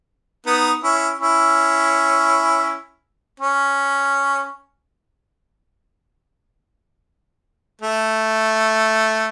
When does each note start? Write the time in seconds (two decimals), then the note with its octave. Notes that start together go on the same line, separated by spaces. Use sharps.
0.46 B3 D#4
0.83 C#4 E4
1.19 C#4 E4
3.40 C#4
7.81 A3